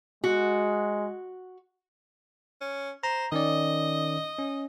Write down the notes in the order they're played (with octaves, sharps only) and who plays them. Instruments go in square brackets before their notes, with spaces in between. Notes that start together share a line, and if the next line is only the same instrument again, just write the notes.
[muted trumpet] G#3 [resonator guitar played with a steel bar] F#4
[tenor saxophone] C#4
[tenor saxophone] C5 [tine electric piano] A#5
[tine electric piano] D#3 C#4 D5 [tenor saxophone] D#5
[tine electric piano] C#4